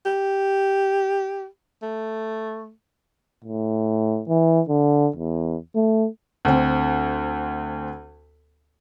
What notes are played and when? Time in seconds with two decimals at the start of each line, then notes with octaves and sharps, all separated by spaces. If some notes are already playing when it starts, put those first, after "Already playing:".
0.05 G4
1.82 A3
3.44 A2
4.28 E3
4.69 D3
5.16 E2
5.75 A3
6.45 D2 C4